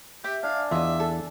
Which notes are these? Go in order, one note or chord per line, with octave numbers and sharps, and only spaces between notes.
G4 E5
D4 F5 G#5
E2 F4 D#5 E5
A4